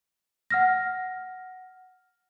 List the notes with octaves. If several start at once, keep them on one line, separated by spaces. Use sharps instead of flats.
F#5 F6 A#6